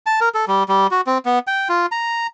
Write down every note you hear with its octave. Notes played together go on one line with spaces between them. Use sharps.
A5
A#4
A4
G3
G3
F#4
C4
B3
G5
F4
A#5